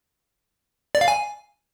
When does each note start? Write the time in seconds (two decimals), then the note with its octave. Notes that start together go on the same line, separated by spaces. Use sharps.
0.95 D5
1.01 F5
1.08 G#5